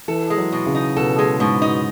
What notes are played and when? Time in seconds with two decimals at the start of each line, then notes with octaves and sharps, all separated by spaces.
0.08 E3 A4
0.30 G#3
0.37 F#3
0.52 B2
0.66 C#3
0.75 D#4
0.96 B2 A4
1.19 G#3
1.40 G#2 B2
1.62 D#4